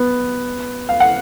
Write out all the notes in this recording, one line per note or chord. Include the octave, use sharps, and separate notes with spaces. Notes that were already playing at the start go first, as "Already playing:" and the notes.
Already playing: B3
F5
F#5